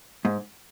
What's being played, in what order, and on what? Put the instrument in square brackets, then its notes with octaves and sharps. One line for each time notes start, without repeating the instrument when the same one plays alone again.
[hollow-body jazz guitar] G#2